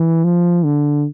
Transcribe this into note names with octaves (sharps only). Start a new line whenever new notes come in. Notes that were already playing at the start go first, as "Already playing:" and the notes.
Already playing: E3
F3
D3